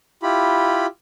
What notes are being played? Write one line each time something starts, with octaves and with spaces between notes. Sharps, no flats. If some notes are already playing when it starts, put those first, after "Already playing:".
E4 F4 G4 B5